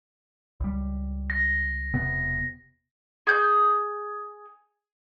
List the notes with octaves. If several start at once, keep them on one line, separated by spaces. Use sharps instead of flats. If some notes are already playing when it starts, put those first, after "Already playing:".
C#2 G3
A#6
E1 C3 B3
G#4 G6